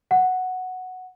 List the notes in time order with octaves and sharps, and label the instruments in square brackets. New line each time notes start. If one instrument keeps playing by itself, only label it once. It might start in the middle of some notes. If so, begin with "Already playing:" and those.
[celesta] F#5